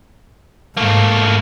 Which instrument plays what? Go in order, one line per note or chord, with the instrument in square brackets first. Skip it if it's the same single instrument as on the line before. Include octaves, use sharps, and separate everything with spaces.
[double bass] G#2 [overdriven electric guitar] A3 A#3